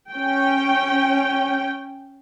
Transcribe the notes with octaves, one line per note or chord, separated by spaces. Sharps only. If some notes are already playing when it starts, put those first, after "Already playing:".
C#4 G5